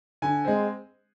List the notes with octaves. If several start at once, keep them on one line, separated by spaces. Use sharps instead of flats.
D3 G#5
G#3 C4